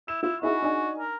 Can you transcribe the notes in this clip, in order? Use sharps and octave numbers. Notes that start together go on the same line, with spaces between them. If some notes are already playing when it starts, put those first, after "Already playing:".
E4 E7
E4 F4
D#4 E4 F#4 G#4
D4 D#4 G#5
A#4